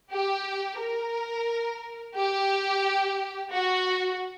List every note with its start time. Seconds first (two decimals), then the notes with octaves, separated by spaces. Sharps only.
0.11 G4
0.79 A#4
2.16 G4
3.52 F#4